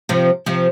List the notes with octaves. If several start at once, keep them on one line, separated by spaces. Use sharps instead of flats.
C3 F3
C3 F3